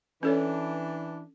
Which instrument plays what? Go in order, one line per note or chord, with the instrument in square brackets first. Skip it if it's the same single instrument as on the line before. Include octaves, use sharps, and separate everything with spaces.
[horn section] E3 D4 [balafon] C#4 A4 C#5